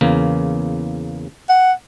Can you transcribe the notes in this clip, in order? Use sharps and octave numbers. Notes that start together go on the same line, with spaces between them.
E2 C#3 A#3
F#5